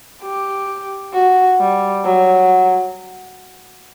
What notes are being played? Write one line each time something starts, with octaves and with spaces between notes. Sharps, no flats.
G4
F#4
G3
F#3